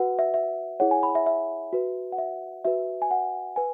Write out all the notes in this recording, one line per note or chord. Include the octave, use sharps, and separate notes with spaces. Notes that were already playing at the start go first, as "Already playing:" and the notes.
Already playing: F#4 B4 F#5
E5
E5
E4 G#4 C#5 F#5
G#5
B5
E5
E5
F#4 B4
F#5
E5
F#4 B4 E5
G#5
F#5
B4 G#5